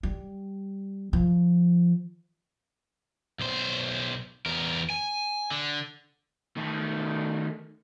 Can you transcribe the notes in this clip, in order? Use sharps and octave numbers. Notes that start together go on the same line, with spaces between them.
G3
F3
B1 C5
E2 A#4
G#5
D3
D#3 A3